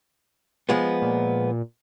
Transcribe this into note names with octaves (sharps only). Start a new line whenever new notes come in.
F3 G#3 B3
A#2